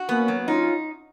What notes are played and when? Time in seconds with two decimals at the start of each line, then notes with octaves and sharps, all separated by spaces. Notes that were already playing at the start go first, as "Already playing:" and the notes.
Already playing: F#4
0.09 A#3 B3 C#4
0.28 F#3
0.47 C#4 D#4 F4